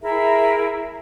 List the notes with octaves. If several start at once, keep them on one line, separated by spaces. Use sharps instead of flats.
E4 G#4 A#4 E5